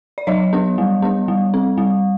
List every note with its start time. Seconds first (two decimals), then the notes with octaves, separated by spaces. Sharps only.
0.18 D5
0.27 F#3 C#5 D#5
0.53 B3 D4
0.78 G3
1.02 B3 D4
1.28 G3
1.54 C4
1.78 G3